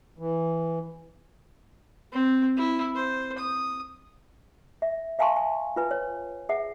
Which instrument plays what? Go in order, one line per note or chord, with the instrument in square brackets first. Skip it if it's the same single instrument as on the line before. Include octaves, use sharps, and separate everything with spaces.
[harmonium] E3
[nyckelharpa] C4
E4
C5
D#6
[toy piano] E5
E5 F5 G#5 A5 C6 C#6
G#5
F4 B4 G#5
C#5
G#4 E5 F#5